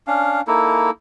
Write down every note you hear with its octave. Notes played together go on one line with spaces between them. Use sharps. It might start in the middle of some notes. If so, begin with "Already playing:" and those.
C#4 D4 F5
A#3 D#4 E4 A4